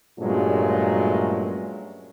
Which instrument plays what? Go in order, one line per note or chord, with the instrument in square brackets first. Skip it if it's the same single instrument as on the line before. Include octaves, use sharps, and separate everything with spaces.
[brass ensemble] G2 A#2 F#3 G#3 A3 C#4